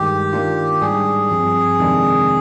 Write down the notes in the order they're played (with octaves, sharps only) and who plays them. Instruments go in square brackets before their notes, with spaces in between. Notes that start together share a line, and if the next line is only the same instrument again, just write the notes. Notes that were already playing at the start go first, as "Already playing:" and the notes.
Already playing: [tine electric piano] G2 D#3 G#3 [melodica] G4
[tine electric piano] D#3 A#3 D4 F4
[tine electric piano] G#2 G3 D4 [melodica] G#4
[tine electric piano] G2 F3 C4
F2 C3 D#3 G#3 D4